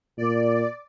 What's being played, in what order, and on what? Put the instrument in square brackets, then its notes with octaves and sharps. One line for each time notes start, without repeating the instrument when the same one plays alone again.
[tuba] A#2 [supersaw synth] D5